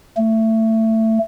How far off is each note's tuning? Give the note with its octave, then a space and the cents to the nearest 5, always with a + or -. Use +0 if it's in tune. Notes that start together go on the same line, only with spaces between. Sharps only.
A3 +20